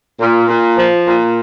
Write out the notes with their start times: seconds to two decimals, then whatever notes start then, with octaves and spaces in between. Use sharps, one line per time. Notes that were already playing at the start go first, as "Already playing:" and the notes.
0.20 A#2
0.48 A#2
0.78 F3
1.06 A#2